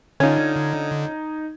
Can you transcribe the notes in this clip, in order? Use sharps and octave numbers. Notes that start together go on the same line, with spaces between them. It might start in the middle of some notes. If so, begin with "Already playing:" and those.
D3 C#4 D#4 F4 G#6